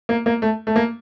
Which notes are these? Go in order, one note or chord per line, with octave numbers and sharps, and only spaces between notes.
A#3
A#3
A3
A3
A#3